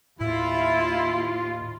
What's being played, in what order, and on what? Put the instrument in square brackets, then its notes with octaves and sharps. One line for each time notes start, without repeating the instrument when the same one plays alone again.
[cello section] D#2 F4 [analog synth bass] A2 [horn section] E4